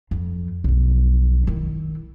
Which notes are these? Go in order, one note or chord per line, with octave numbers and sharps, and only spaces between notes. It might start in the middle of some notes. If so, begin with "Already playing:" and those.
F2
B1 F2
D#3 E4